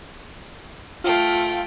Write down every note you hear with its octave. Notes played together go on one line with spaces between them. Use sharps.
A3 F4 F5 G5